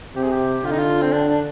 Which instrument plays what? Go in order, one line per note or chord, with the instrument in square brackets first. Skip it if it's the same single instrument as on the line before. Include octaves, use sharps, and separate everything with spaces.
[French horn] C3 [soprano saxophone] G4
[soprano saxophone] G#4
G4
[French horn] D3 [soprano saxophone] F4
[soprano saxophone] D#4
F4
C4
D4
D4